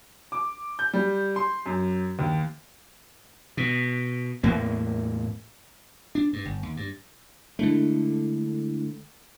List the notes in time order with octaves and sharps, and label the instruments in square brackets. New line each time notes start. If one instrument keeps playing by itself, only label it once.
[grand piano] D6
G6
G3
C6
F#2
D#2
[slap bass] B2
E2 A2 A#3
D4
G2
G1
D#2
G2
[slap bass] D3 A3 [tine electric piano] G#3 D4 E4